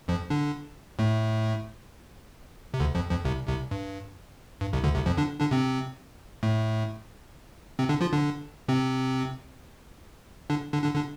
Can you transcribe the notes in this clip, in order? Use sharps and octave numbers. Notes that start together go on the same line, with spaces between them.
F2 F3
D3 D4
A2 A3
C3
D2 D3
F2 F3
F2 F3
C2 C3
C2 C3
G2
G2
C2 C3
D2 D3
C2 C3
F2 F3
D3 D4
D3 D4
C3 C4
A2 A3
C3 C4
D3 D4
F3 F4
D3 D4
C3 C4
D3 D4
D3 D4
D3 D4
D3 D4